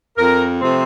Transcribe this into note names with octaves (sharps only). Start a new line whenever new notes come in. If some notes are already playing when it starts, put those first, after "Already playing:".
F2 A#4
C3 F3 A3 C4